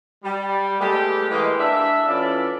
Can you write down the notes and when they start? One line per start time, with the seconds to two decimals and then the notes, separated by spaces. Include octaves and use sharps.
0.24 G3
0.81 G#3 A3 B3 G4
1.31 E3 G#3 A#3
1.60 D4 E5
2.08 E3 C#4 E4 F4 A4 D5